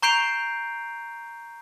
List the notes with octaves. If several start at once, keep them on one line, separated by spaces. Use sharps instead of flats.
A#5 C#6 G6 C7 D7 F7